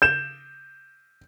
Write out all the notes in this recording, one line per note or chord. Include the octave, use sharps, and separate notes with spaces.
G6 E7